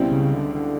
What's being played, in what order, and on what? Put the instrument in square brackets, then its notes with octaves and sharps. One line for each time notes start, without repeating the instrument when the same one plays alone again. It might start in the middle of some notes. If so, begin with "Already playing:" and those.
Already playing: [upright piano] C#2 B2 G3 C4 E4
[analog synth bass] C#3
D3
D3